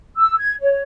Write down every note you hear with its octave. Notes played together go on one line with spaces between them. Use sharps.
E6
G#6
C#5